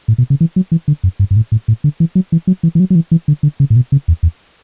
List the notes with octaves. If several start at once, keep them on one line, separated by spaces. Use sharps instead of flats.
A2
B2
C#3
E3
F#3
E3
D3
F#2
G2
G2
A2
A2
A2
D3
E3
F#3
E3
F#3
E3
E3
F#3
F#3
E3
E3
D3
D3
C#3
A2
B2
C#3
E2
E2